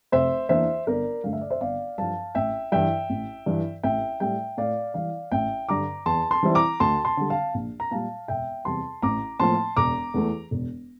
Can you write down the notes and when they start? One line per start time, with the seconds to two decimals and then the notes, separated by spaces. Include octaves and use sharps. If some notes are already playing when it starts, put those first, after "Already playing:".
0.12 F1 C5 E5
0.49 E2 E3 A#3 D4 C5 E5
0.87 G1 A#4 D5
1.24 G2 D3 A3 F5
1.33 E5
1.41 D5
1.50 C5 E5
1.61 G1 D5 F5
1.98 G2 F3 F5 A5
2.35 A1 E5 G5
2.72 G2 E3 E5 G5
3.10 A1
3.46 G2 E3
3.83 A1 E5 G5
4.20 A2 G3 E5 G5
4.58 A2 D5 F5
4.94 E3 G3 D5 F5
5.32 A1 E5 G5
5.69 G2 D3 A#5 D6
6.06 E2 A5 C6
6.31 A5 C6
6.43 E3 G3 C4 E4
6.55 A#5 D6
6.80 D2 A5 C6
7.05 A5 C6
7.17 D3 G3
7.30 F5 A5
7.54 A#1
7.80 A#5
7.91 A#2 G3 F5 A5
8.28 E1 E5 G5
8.65 E2 C3 G3 A5 C6
9.02 A1 A#5 D6
9.40 A2 F3 A#3 A5 C6
9.77 E1 A#5 D6
10.14 E2 E3 A3
10.51 E1